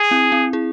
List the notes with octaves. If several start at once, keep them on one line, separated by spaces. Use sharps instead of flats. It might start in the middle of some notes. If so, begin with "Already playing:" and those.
Already playing: G#4
C4 E4
C4 E4
E4 G#4